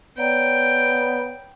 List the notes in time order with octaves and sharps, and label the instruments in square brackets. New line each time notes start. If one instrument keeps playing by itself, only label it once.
[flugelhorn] B3 [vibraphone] C#5 D5 A#5 [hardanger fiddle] G5